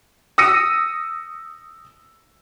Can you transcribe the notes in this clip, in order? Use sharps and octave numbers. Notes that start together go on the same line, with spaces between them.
D#6 E6 A#6 C#7 D#7